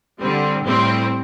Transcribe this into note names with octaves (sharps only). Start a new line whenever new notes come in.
D3 G3 C4
A2 G3 C4